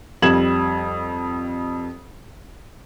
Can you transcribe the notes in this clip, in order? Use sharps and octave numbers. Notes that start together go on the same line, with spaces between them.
F2 G3 G#6 E7 F#7